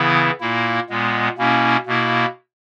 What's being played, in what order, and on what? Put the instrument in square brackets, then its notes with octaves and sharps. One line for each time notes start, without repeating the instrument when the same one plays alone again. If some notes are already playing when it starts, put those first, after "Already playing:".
Already playing: [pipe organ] C#3 E3 B3 E4
A#2 A#3 E4
A#2 G#3 B3
B2 A#3 C#4 E4
B2 A#3 E4